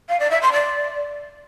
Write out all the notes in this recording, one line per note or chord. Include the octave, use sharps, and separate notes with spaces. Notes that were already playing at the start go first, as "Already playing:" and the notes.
F5
D5
E5
C6
D5